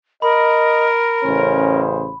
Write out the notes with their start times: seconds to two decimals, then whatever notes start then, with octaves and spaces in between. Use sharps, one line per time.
0.22 A#4 D#5 B5
1.24 A1 C#3 C#4 C5